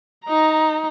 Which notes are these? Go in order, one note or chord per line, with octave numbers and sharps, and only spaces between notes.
D#4 A#5